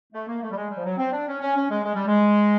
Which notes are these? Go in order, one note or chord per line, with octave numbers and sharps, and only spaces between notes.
A3
A#3
A3
G3
G#3
G3
F3
F#3
C4
D4
C#4
C#4
C#4
G#3
G#3
G3
G#3